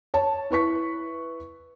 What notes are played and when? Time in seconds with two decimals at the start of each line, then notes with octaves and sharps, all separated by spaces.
0.14 C#5 A5
0.50 E4 B4 C#6 B6